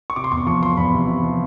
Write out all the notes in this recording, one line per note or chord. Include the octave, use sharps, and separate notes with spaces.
C#6
C3 D6
C6
E2 C#6
F3 C#6
F3 C6
E2 B5
C3
C3
F3